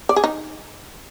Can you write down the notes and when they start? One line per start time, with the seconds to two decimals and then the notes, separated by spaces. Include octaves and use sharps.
0.09 D5
0.16 G#4
0.24 D#4